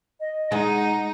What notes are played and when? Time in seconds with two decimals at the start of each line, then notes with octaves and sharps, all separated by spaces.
0.20 D#5
0.52 G#3 D#4 F#5